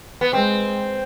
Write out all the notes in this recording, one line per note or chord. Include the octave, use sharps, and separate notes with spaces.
B3
G#3 C4